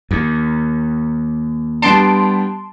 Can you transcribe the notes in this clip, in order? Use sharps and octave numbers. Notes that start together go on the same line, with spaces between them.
D#2
G3 B3 D4 A5 C6 D7